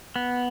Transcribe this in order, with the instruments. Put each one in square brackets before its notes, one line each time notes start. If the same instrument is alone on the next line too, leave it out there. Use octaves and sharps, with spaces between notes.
[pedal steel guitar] B3